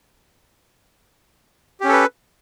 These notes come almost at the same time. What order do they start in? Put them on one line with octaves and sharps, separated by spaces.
G4 C#4 A4 B4